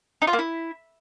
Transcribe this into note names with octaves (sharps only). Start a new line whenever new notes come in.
D#4
F4
A#3
E4